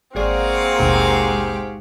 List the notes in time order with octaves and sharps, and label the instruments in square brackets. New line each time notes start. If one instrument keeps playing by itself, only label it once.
[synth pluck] G#1 G#3 D5 [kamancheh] A#3 C4 [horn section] F#4 G#4 F5
[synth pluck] A1 D#2 B2 [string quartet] G#2 G4